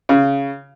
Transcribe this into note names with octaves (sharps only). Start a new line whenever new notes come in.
C#3